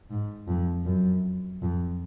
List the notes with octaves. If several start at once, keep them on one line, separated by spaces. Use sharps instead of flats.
G#2
F2
F#2
F2